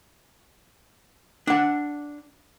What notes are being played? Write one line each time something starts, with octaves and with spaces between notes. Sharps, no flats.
D4 F#5